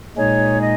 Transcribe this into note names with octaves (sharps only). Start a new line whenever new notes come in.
A#2 G#3 D#4 G#4 C#5
D#5